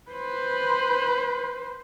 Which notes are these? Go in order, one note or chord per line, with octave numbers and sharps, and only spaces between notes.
B4 C5